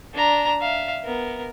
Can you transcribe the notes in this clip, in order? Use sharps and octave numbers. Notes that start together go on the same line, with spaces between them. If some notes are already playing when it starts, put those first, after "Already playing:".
D4 A#5
E5 F5
B3 A#4